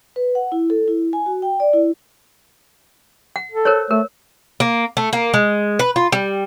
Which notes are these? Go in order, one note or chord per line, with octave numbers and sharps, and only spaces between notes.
B4
F#5
E4
A4
E4
G#5
F#4
G5
D5
E4
F#5
A4
A#4 C5 C#5
A3 A#4
A#3
A3
A#3
G#3
B4
F4
G3